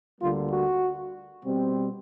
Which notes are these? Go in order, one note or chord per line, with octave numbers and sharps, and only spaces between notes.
D2 D3 G3 A#3 F4
F#4
B2 G3 C4